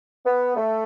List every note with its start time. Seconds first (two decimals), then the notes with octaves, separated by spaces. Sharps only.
0.25 B3
0.56 A3